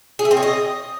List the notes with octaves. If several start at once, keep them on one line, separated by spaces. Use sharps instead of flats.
G#4
E5
C4
C#5
D#5